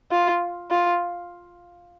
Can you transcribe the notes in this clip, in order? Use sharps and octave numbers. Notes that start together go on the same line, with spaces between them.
F4
F4